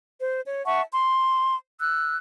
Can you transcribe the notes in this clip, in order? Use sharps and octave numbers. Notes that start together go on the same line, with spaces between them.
C5
C#5
E5 F#5 A5 C#6
C6
E6 F#6